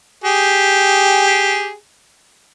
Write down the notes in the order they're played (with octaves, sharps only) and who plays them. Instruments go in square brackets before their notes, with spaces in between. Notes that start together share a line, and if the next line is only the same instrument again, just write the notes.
[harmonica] G4 G#4